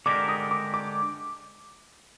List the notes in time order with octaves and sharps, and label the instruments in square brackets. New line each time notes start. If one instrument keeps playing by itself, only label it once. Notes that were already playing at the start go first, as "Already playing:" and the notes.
[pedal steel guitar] D3 G#3 D4 G4 A#4 [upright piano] D6
[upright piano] D#6
D6
D6